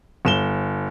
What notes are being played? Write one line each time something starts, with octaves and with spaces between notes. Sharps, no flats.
G1 E7 G7